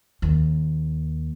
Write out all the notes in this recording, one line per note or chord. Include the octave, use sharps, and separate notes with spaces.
D#2